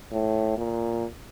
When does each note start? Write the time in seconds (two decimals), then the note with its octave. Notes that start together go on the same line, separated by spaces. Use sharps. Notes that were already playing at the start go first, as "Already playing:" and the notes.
0.12 A2
0.57 A#2